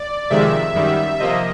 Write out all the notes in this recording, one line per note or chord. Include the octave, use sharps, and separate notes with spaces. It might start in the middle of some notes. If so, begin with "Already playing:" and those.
Already playing: D5
F2 C3 D#3 G#3 E5
F#2 D#3 G3
C3 F3 A#3 D#5